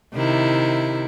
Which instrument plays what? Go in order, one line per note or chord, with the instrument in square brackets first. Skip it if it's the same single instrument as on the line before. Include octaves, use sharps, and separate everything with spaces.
[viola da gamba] C3 D#3 E4